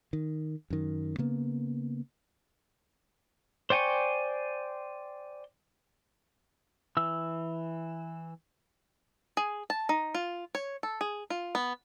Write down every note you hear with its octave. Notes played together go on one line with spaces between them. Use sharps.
D#3
F#2 D#3
C#3 A#3 B3
C5 D5 G5 G#5 C#6
E3 E6
G#4
A5
D#4
F4
C#5
A4
G#4
F4
B3